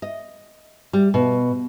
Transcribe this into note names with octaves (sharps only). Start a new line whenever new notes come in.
D#5
G3
B2